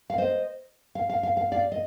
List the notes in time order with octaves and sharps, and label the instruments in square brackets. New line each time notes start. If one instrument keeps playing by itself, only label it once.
[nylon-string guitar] F5
C5 D#5
F5
F5
F5
F5
D5 F5
D#5